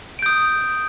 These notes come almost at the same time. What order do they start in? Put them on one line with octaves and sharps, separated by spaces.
D7 G6 D#6